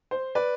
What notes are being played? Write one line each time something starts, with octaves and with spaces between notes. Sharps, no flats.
C5
B4 D5